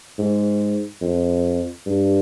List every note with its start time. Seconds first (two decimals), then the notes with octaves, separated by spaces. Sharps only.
0.18 G#2
1.02 F2
1.86 G2